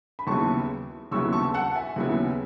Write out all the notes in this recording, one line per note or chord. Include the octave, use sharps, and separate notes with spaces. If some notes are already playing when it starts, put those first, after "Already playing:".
B5
D#2 C#3 F#3 B3 E4 A5 C#6
D#2 C#3 F#3 B3 E4 C#6 E6
A5 C#6
F#5 A5
E5 G#5
D#2 C#3 F#3 B3 E4